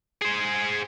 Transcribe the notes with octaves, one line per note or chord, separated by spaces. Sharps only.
G#4 C5